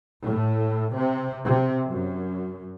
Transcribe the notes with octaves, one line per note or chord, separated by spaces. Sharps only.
A2
C3
C3
F#2